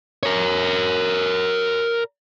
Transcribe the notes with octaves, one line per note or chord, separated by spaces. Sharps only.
A#4 C#5